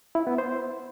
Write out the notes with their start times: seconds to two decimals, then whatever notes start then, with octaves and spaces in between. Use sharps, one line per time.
0.15 E4
0.27 B3
0.38 C5